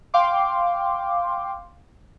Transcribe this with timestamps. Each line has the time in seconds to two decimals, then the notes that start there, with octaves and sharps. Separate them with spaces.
0.14 F5 G5 C6 D6